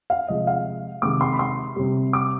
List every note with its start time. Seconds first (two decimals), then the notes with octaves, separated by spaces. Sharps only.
0.10 F5
0.28 C3 F3 G#3 D#5
0.47 F5
1.02 C3 D#3 G#3 D6
1.21 C6
1.33 B5
1.39 C6
1.76 C3 G3
2.13 D6